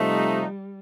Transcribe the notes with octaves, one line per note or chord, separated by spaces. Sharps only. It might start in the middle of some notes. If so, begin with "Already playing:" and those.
Already playing: C3 F3 G3 A3 D#4